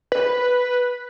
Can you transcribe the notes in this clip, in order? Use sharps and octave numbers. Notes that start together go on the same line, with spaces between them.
B4